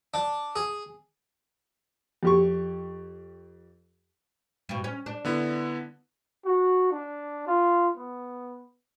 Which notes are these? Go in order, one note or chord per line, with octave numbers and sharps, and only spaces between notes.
D4
G#4
F2 G4 C#6
G2 B2
C#4
D4
D3 B3 E4
F#4
D4
F4
B3